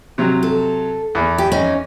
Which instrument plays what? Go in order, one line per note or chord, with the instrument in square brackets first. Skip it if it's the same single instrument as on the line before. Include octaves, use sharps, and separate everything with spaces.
[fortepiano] C3 F#3
[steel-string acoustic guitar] A4
[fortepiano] E2
[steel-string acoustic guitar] G4
C#4 D#4